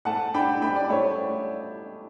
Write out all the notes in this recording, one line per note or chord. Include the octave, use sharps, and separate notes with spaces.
A3 F#5 A5
D4 G5 B5
A3 G5 B5
D5
A3 C#5